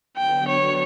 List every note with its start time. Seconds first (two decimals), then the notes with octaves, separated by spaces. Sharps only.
0.17 D3 F#3 B3 G5
0.48 C#5